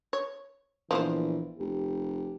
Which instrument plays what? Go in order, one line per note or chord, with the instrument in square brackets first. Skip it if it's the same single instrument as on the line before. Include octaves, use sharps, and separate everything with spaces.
[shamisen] C#5
[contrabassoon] A#1 [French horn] E3 [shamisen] F3 B3 C5
[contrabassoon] F1 [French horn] G4